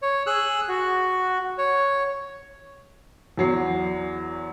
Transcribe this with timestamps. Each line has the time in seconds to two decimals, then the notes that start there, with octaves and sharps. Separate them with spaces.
0.02 C#5
0.26 G#4 E6 F#6
0.68 F#4
1.58 C#5
3.38 E2 F#3 C7